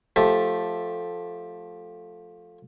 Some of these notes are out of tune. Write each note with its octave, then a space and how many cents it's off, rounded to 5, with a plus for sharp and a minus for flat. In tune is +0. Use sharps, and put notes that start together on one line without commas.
F3 +15 A3 +0 G4 +0